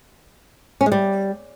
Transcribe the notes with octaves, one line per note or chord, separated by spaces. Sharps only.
C#4
G#3
G3